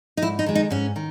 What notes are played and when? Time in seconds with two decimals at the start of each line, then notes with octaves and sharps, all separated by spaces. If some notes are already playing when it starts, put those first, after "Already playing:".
0.17 D#4
0.22 G#2 E4
0.39 D#4
0.46 D#3 G#3
0.55 D#4
0.70 G#2 C#4
0.96 D#3